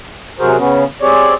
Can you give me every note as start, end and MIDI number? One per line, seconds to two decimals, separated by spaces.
0.40 0.56 48
0.40 0.56 54
0.40 0.56 66
0.40 0.56 68
0.40 0.56 70
0.40 0.56 72
0.57 0.84 49
0.57 0.84 59
0.57 0.84 61
1.02 1.34 60
1.02 1.34 67
1.02 1.34 68
1.02 1.34 73
1.02 1.34 74